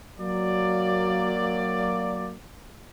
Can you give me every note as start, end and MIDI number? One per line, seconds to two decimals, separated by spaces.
0.19 2.32 54
0.19 2.32 58
0.19 2.32 74